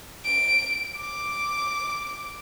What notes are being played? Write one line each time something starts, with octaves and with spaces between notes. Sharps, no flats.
D7
D6